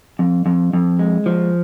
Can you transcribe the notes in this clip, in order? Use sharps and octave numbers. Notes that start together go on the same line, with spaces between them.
F2
F2
F2
G#3
F3